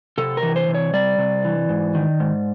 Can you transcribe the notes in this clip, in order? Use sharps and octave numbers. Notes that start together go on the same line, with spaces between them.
C3 A4
A#4
E3
C5
C3
C#5
G3 D5
C3
E3
G#2
D#3
G#2